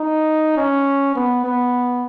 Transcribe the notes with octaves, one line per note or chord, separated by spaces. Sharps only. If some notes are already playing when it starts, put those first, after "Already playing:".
Already playing: D#4
C#4
B3
B3